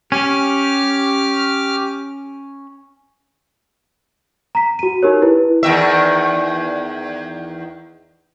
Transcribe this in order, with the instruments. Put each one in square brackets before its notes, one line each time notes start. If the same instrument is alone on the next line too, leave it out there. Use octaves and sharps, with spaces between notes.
[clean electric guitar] C#4 [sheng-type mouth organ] G4 D6 F6
[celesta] A#5 B6
F#4 D#7
D#4 G4 A#4 C#5
E4 B4
[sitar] E2 D#3 E5